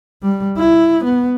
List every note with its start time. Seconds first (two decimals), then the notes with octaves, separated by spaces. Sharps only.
0.23 G3
0.58 E4
1.04 B3